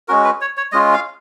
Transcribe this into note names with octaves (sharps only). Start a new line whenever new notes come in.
G#3 C#4 F#4 A#4
B4
C#5
C#5
G#3 C#4 F4 D#5
F5